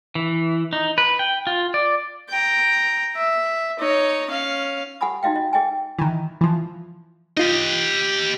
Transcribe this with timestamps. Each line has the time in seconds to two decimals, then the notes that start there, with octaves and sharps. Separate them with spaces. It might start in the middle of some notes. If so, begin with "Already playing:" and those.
0.15 E3
0.73 D#4
0.98 B4
1.19 G5
1.47 F4
1.74 D5
2.30 G5 A#5
3.16 E5
3.79 D#4 C#5
4.31 C#4 F5
5.01 G4 F#5 G#5 B5 D#6
5.23 D#4 F#4 D#5 F5 G5
5.36 D#5
5.53 G#4 D#5 G5 G#5
5.99 D#3 E3
6.41 E3 F3
7.37 D#4 F4 G4 D#5